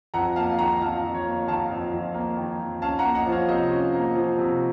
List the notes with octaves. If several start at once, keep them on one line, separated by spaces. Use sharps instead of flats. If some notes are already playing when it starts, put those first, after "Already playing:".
F2 F#5 A#5
A#3 F5 A5
D#3 F#5 A#5
F2 F5 A5
F2
C#5
A#3
D#3 F5 A5
F2
F2
A#3
D#3
F2
C#4 F5 A5
F#5 A#5
A#3
D#5 F#5
F3
C#5 F5
C3 C5 D#5
C#4
A#3
F3
C3